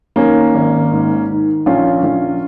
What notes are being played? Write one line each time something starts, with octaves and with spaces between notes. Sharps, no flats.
D#3 A#3 C#4
G#1
G#2
D#3
A#1 C#4 F4
A#1